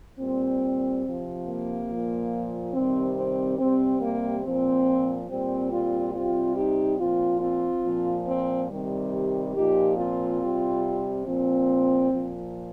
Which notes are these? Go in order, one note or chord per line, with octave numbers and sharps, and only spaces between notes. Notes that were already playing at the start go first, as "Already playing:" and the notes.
A#2 G3 C4
C3 F3
A#3
A#2 F3
C3 D#3 G3 C4
C4
C3 G3 C4
A#3
A#2 F3 C4
A#2 G3 C4
C4 F4
C3 G3 C4 F4
D#4 G4
A#2 F3 C4 F4
C4 F4
A#2 F3
C4
C3 D#3 G3
A#2 F3 D#4 G4
C4 F4
C3 G3
A#2 F3 C4
A#2 F3